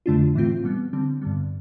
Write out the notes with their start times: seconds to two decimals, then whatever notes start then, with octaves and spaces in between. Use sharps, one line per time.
0.06 F2 D3 A3 D4 F4
0.35 A2 E3 A3 C4 F4
0.64 B2 G3 B3
0.93 D3 G3 C4
1.22 G2 D3 G3 B3